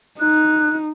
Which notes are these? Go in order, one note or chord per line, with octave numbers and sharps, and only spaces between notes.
D#4 F#6